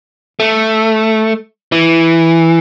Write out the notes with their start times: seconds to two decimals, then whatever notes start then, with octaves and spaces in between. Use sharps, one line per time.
0.40 A3
1.72 E3